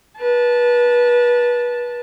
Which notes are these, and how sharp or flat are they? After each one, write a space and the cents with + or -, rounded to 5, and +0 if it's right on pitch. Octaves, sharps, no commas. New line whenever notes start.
B4 -30 A5 -10